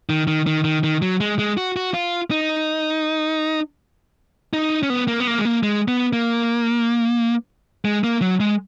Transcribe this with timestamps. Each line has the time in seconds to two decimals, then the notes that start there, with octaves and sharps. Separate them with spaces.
0.10 D#3
0.28 D#3
0.47 D#3
0.64 D#3
0.83 D#3
1.02 F#3
1.20 G#3
1.39 G#3
1.57 F#4
1.76 F#4
1.94 F4
2.31 D#4
4.53 D#4
4.83 C#4
4.90 B3
5.08 A#3
5.20 B3
5.27 A#3
5.38 G#3
5.45 A#3
5.63 G#3
5.88 B3
6.13 A#3
7.85 G#3
8.04 A#3
8.21 F#3
8.40 G#3